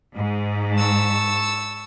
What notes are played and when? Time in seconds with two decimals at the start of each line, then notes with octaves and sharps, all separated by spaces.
0.17 G#2
0.74 A5 C#6 E6